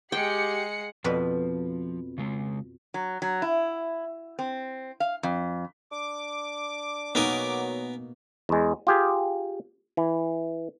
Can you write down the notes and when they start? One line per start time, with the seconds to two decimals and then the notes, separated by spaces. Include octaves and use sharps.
0.12 G#3 G4 F#5 G5 C7 C#7
1.04 F2 B2 F3 B4
2.18 C#3 G#3
2.94 F#3
3.22 F#3
3.42 E4
4.39 C4
5.00 F5
5.23 F2
5.92 D4 D6
7.15 B2 F#3 A#3 B3 D#4 A#4 G#5
8.49 E2 G#3
8.87 F4 G4 G#4
9.97 E3